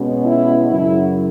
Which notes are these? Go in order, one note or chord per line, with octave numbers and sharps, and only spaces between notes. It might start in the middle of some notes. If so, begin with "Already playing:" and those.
Already playing: B2 G#3 C#4
E4
F#2 C#3 F#3 E4